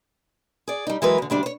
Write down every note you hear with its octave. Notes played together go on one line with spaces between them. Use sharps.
G#4 D5
G3 D#4
E3 F#3 G#3 A#4 B4
E2 D3
D2 G3 D4 D5
C5 C#5